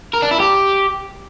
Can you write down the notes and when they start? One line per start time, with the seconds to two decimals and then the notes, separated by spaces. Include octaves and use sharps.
0.13 A#4
0.22 D4
0.31 E4
0.40 G4